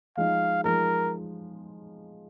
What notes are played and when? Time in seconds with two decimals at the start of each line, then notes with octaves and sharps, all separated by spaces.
0.17 F3 G#3 D#4 F5
0.64 F3 G#3 D#4 A#4